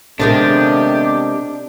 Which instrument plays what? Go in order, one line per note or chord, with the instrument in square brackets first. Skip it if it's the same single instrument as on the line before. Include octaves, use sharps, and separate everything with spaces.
[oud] C3 D#3 G#3 [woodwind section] A3 B3 G4 [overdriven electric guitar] D4